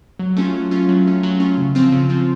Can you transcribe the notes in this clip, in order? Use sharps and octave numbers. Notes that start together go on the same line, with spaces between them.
F#3
A3 C#4 F4
F#3
A3 C#4 F4
F#3
A3 C#4 F4
F#3
A3 C#4 F4
C#3
F3 C4 F4
C#3
F3 C4 F4